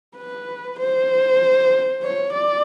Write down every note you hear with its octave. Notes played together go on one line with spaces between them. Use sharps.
B4
C5
C#5
D5